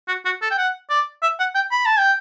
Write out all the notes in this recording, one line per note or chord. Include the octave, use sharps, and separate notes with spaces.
F#4
F#4
A4
G5
F#5
D5
E5
F#5
G5
B5
A5
G5